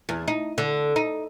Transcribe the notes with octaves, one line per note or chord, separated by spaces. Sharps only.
E2
D#4
D3
D#4